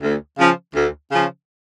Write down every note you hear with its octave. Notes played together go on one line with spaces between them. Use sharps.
D2
C#3 F3 C#4
D2
C#3 F3 C#4